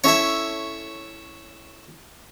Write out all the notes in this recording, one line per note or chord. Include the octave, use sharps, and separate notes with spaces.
C#4 E4 A4 C#5 E5